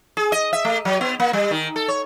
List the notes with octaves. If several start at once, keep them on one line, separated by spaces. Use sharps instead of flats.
G#4
D#5
E5
A3
F#3
B3
A#3
G3
D#3
A4
C#5